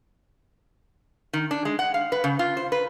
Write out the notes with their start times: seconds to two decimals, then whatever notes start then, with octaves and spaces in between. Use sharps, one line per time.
1.33 D#3
1.51 D4
1.65 G#3
1.79 F#5
1.94 F5
2.12 B4
2.24 C#3
2.39 F4
2.57 C5
2.72 B4